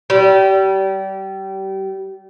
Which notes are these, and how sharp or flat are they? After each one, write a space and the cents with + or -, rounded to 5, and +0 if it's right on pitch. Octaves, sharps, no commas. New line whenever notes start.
G3 -30